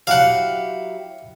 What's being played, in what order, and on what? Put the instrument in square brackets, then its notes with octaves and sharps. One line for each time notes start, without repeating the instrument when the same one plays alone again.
[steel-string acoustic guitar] F#3 E4 G4 [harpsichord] F5 F#5